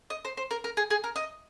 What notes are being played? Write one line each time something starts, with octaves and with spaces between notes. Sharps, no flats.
D#5
C5
C5
A#4
A#4
G#4
G#4
A#4
D#5